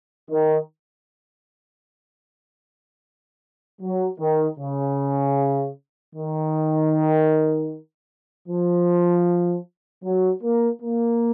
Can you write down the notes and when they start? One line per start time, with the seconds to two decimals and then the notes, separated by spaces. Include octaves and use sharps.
0.31 D#3
3.81 F#3
4.20 D#3
4.59 C#3
6.15 D#3
8.48 F3
10.05 F#3
10.43 A#3
10.82 A#3